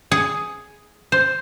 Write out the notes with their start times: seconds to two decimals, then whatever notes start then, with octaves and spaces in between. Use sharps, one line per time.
0.12 G#4
1.12 C5